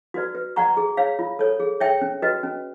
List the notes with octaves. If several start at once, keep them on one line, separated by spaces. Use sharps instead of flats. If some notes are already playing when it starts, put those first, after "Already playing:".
F#4 B4 D5
B4
D5 F#5 A#5 C#6
G#4
C#5 F5
F4
A4 C#5
G#4
C#5 E5 G5
C#4
F#4 B4 D#5
C#4